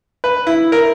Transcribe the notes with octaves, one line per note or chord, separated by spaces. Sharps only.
B4
E4
A#4